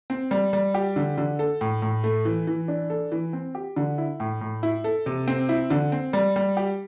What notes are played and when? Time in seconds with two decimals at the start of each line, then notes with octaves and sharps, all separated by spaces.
0.10 C4
0.31 G3
0.53 G3
0.74 G4
0.96 D3
1.18 D3
1.39 A4
1.61 A2
1.82 A2
2.04 A3
2.25 E3
2.47 E3
2.68 D4
2.90 A4
3.12 E3
3.33 C4
3.55 G4
3.76 D3
3.98 E4
4.20 A2
4.41 A2
4.63 E4
4.84 A4
5.06 C3
5.28 C4
5.49 E4
5.70 D3
5.92 C4
6.13 G3
6.36 G3
6.57 G4